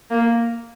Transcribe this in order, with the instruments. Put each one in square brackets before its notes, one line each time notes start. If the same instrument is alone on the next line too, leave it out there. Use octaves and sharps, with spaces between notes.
[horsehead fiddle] A#3